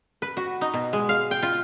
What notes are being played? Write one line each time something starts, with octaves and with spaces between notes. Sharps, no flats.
B4
F#4
D#4
B2
G#3
F5
G5
F4